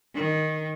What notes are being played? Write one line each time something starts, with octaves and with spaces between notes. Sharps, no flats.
D#3